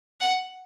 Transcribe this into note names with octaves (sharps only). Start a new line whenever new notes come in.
F#5